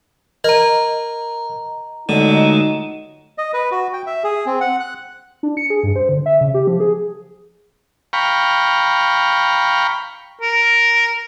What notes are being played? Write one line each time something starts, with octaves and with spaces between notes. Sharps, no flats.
A#4 D#5 A#5
A#2 D3 F#3 G#3 A3 D#4
D#5
B4
F#4
G5
E5
G#4
C4
F#5
F#6
D4
C#7
G#4
G2
C5
D3
E5
C#3
G4
F3
G#4
F5 G5 A#5 B5 C#6
A#4